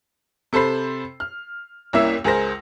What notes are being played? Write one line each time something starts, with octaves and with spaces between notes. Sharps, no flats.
C3 A4 C5 B5 C7
F6
C2 A#3 C#4 E4 E5 E6
C#2 G#4 A#4 C5 A#6